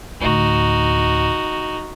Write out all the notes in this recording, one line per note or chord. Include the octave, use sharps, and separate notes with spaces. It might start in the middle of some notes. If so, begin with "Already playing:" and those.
D2 A2 D#4 F#4